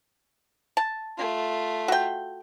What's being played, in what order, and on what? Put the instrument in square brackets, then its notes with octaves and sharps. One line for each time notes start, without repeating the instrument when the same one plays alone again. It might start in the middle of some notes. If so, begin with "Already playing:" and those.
[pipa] A5
[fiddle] A3 F4
[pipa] F#4 G5